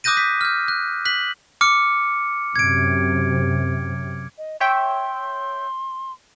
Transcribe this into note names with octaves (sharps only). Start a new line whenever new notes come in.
D6 D#6 F#6 G6 A#6 D#7
G6 B6
F6 G6
F#6
F#6 B6 F#7
D6 F6 C#7
F#2 C3 G#6 D7
D#5
C#5 E5 G5 C6